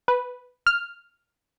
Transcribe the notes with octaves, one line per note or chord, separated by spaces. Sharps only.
B4
F6